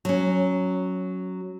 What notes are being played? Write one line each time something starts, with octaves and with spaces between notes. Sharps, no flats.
F#3 C#4